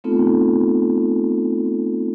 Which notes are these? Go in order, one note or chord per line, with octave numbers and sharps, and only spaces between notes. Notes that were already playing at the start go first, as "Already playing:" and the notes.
A3 B3 C4 D#4 F4 A4